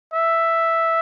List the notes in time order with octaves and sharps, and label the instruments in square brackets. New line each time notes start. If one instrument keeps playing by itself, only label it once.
[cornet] E5